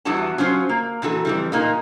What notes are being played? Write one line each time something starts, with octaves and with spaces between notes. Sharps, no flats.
E2 E3 G3 B3 F#4 A5
F#3 C#4 F4 C5
A#3
A#2 E3 F#4 A4
F2 E3 G3
A#2 A#3 D#4